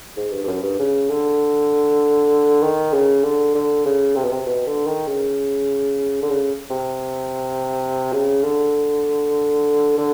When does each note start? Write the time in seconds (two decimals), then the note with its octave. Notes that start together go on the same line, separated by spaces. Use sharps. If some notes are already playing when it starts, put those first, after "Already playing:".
0.17 G#2
0.32 G2
0.44 G2
0.48 F#2
0.63 G2
0.79 C#3
1.10 D3
2.62 D#3
2.93 C#3
3.23 D3
3.55 D3
3.85 C#3
4.16 C3
4.24 B2
4.32 C3
4.46 B2
4.67 D3
4.86 D#3
5.08 C#3
6.22 D3
6.30 C#3
6.70 C3
8.13 C#3
8.43 D3
9.98 D3